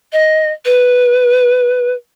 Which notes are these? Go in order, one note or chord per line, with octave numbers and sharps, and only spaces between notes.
D#5
B4